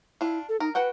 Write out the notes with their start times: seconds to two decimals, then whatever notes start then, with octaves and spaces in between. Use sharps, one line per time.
0.21 D4 E4 F4
0.49 A4
0.60 D#4 A#4
0.75 F#4 B4 F#5 G5